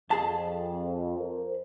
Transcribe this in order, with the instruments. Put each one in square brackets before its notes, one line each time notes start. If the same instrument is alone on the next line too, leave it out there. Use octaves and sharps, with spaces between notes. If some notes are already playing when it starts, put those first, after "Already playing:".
[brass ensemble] F2 [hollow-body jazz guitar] G#4 A5
[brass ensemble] A#4 C5